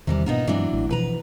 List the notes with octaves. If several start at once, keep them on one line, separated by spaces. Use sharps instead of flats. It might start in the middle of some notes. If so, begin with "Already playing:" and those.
E2 C3 D#3 E3 G3
G#2 B2 A#3 B3 D4 D#4
G2 E3 F#3 G#3 C4 D4
A1 A2 A3
B2 E3 F3 B4 A#5